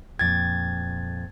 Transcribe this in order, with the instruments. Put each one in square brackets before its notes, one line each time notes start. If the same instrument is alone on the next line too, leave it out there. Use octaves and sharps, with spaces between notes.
[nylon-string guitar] F2 A#2 G5 [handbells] G#6 A6